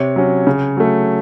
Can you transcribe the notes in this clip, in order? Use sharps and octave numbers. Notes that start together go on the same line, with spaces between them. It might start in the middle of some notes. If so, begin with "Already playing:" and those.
Already playing: C3 C#5
F#3 C#4
C#3
F#3 A3